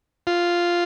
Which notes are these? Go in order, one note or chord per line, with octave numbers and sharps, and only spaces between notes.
F4